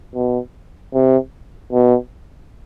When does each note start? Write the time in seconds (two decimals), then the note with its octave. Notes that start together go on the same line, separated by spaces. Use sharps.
0.15 B2
0.94 C3
1.72 B2